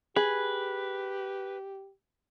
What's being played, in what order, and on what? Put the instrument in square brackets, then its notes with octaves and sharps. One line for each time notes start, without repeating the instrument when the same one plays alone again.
[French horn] G4 [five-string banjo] G#4 [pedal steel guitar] B4